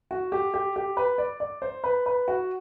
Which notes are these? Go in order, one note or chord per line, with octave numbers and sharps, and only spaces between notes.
F#4
G4
G4
G4
B4
D5
D5
C5
B4
B4
F#4